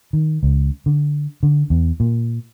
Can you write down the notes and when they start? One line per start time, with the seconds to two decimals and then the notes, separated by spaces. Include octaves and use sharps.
0.13 D#3
0.43 C#2
0.86 D3
1.43 D3
1.70 E2
2.00 A#2